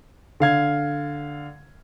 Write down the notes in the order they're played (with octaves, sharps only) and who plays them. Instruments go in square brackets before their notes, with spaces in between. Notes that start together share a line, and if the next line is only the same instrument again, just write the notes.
[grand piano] D3 F5 G#6